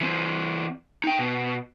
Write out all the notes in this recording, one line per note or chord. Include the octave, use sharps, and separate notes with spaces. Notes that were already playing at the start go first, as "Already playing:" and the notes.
E3 C4
D#4 G5
B2